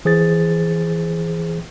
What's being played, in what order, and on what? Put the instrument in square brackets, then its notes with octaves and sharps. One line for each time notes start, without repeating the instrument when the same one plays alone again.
[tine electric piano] E3 G#4 C5 A6